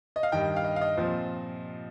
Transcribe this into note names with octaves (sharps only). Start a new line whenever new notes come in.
D#5
F5
G2 D#3 G3 D#5 G5
F5
D#5
F5
D#5
A#2 F3 C4